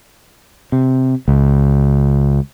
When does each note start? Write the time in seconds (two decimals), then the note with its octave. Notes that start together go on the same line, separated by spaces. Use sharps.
0.72 C3
1.28 C#2